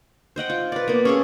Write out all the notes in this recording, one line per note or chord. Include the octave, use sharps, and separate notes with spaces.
C5 D#5 F#5 G5
F4
B4 D5
A#3 B3
C#4 G#4 A4